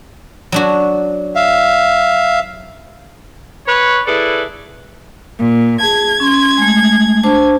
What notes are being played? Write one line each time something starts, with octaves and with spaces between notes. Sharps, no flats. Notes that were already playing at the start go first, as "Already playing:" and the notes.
F#3 D4 F#4
E5 F5
B4 C#5
E4 G#4 A4 B4 D5
A#2
G#4 A5 G#6
C#4 C6
G#3 A3
D4 C5 A5